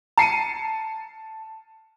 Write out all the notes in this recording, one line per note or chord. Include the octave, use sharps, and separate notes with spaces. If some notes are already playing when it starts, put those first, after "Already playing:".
A5 C7 C#7 D#7